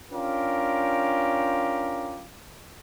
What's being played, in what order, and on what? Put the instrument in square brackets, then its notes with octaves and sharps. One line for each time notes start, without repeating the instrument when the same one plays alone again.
[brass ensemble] C#4 D4 F4 G4 A#4